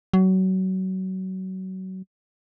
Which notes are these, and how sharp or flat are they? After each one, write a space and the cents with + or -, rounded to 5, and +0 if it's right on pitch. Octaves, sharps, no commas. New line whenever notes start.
F#3 +25